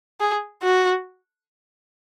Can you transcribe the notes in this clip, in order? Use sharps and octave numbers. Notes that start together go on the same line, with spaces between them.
G#4
F#4